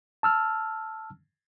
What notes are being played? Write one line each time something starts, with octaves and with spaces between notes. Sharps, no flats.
A5 E6 F6